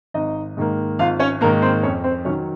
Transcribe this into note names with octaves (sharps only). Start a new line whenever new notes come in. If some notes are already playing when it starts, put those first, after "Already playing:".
G#1 D#4 D#5
G#2 D#3 A#3
G#1 F4 F5
C#4 C#5
G#2 D#3 A#3 A#4
C4 C5
F2 C#4 C#5
C4 C5
D#3 F#3 C#4 C#5